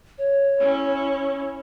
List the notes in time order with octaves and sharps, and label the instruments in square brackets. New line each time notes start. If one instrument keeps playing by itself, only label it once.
[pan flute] C#5
[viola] C#4 E4